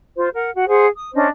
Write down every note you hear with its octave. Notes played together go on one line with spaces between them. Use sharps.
F4 C5
A#4 F#5
F#4
G#4 C5 F#5
D#6
C#4 D4 C5 D#5